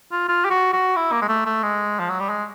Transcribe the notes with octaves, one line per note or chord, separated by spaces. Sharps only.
F4
F4
G4
F#4
F#4
E4
A#3
G#3
A3
A3
G#3
F3
F#3
G3
G#3